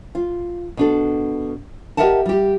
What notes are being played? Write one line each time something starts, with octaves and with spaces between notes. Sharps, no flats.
F4
B2 D4 A4
G4 A#4 D#5 E5 F#5 A5
G3 G4